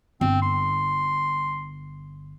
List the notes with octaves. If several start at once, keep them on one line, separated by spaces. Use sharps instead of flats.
G1 C4
C6